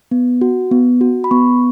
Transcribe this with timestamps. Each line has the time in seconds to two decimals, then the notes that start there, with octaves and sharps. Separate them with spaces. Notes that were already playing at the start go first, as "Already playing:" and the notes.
0.11 B3
0.41 F#4
0.71 B3
1.01 F#4
1.24 B5
1.31 B3 C#6